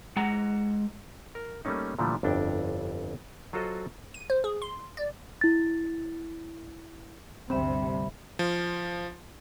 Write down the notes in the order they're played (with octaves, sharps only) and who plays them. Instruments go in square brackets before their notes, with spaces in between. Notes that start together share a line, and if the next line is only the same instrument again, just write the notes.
[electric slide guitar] G#3 F#5 A#5
[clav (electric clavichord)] A#4
G3 A3 A#3 C#4 D#4
A#2 D3 E3 F3 G3 A3
G1 F2 D4 E4 G5
F#3 F4 F#4 A4 C5 D#5
[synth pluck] D#7
C5
G#4
C6
D5
[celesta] E4 A6
[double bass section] G1 D2 G3 [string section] C3 [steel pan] C4 [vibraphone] E5 B5
[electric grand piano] F3